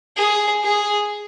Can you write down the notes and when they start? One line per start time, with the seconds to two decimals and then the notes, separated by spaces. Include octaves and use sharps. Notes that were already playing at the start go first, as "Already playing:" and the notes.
0.17 G#4
0.63 G#4